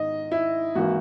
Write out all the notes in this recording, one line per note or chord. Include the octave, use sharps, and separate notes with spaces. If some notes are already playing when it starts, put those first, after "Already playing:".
Already playing: G#2 D#3 D#5
E4
G#1 E3 A#3 E4 F#4